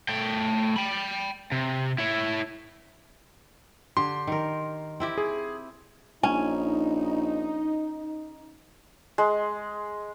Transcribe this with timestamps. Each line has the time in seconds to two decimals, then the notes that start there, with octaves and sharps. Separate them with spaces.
0.09 A3 G5
0.76 G5 B5
1.52 C3
1.98 E4 C#5
3.97 D3 G4 C6
4.27 D#3 A#4
5.00 C4 E4 G4
5.18 G#4
6.23 A#1 C#4 D#4 G#5
9.18 G#3